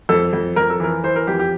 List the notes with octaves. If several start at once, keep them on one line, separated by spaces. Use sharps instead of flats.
F2 A4
F2
F2 A#4
A4
E3 A#4
E3 C5
A#4
F2 G4
G4